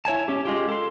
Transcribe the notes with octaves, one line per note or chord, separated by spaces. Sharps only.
E4 C#5 G#5 A5
C#4 G4
G#3 F4 G4
A4 C6